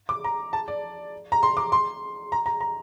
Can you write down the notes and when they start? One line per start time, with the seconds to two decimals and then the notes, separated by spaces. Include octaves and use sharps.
0.09 D6
0.24 A#5
0.53 A5
0.68 D5
1.32 A#5
1.43 C6
1.57 D6
1.72 C6
2.32 A#5
2.46 A#5
2.61 A#5